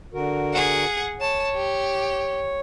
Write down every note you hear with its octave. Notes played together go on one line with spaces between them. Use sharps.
D3 F#4 A#4
G#4 F#5
C#5 A5
G4